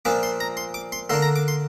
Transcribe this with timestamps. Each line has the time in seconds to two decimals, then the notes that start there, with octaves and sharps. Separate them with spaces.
0.05 A#2 F3 D4 D6
0.23 C6
0.40 A#5
0.57 C6
0.74 D6
0.92 C6
1.10 D3 A#3 D4 C6
1.22 A#5
1.36 D6
1.48 C6